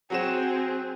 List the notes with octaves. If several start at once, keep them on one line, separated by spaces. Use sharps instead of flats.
F#3 C4 F#4 G#4 E7